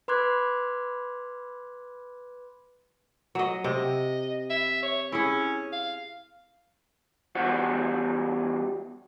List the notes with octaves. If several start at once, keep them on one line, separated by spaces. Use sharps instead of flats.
B4 B5 C6 D6 F#6 G#6
F#3 D#5
C3 D#5
E5
C#5
C#4 E4 G#4
F5
E2 G3 F#4 C5 F#5